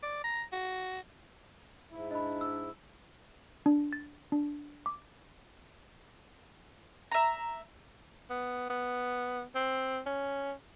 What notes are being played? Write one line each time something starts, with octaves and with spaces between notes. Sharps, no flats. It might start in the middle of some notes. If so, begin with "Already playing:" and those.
D5
A#5
F#4
G#2 E4 E5
D4 D#5 B5
E6
D4
A6
D4
D6
E5 A#5
B3
B3
C4
C#4